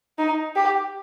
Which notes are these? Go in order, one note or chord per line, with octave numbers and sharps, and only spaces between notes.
D#4
G4